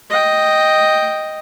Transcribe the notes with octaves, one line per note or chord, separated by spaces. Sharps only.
D#5 G5